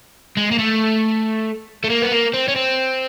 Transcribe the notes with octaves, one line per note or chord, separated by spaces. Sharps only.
G#3
A#3
A3
A3
A#3
B3
A#3
C4
C#4
C4